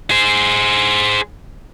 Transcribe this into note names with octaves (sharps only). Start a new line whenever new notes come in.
G#4 C5